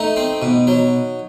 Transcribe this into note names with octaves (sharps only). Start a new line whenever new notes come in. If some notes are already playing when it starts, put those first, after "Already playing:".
Already playing: A3 D#4
C4
B2
F#3